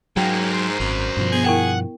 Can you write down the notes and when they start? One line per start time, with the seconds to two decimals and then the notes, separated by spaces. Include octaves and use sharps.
0.17 G#2 F#3 A#3 C#4 G5
0.52 A#4 C5
0.80 G#1 F#2
1.17 G2 B2 F3
1.32 B3 G#4
1.45 E4 A#4 F#5 G5